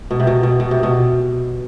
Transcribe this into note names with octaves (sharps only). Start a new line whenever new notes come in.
B2
C3
B2
B2
B2
C3
B2